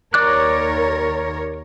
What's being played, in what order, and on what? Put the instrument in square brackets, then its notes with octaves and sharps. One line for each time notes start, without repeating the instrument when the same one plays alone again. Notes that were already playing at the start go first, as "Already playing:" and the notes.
[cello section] D#2 A#4 C#5 [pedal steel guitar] D5 D6 F#6